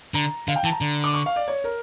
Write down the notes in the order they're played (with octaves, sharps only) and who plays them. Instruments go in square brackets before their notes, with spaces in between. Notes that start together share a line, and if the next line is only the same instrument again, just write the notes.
[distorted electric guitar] D3 [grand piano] A#5
[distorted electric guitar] D3 [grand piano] F5
[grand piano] G5
[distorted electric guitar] E3 [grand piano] A5
[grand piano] A#5
[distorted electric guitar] D3
[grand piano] D6
C#6
F5
D5
C#5
A#4